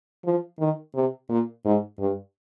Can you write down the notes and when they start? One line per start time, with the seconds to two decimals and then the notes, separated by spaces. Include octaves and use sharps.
0.25 F3
0.59 D#3
0.94 C3
1.29 A#2
1.65 G#2
1.99 G2